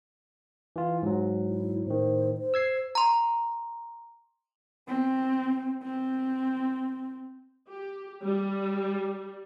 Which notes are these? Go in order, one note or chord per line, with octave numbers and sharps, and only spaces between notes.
E3 F4
G#2 F#3
E4
A2 D#3 C5
C5
E6 G#6 C7
A#5 C6
C4
C4
G4
G3